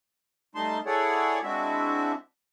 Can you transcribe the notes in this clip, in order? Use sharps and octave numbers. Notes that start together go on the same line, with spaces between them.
G3 A3 D#4 A5 C6
E4 G#4 A4 C#5 D5 F#5
G#3 C4 D4 E4 F#4 E5